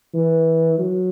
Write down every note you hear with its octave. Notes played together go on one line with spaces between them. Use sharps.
E3
F#3